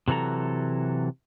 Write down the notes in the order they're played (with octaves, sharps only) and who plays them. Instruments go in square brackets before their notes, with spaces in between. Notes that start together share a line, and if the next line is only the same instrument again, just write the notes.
[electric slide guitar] C3 E3 F#3 A4 A#5